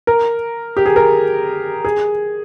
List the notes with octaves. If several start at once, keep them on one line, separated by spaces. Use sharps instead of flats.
A#4
G4
G#4
A#4
G#4